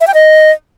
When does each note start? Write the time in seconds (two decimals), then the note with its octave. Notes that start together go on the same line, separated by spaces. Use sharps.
0.01 E5
0.07 G5
0.14 D#5